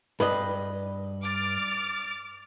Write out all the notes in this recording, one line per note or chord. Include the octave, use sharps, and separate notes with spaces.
G2 B4 D#5
D6 F6 A6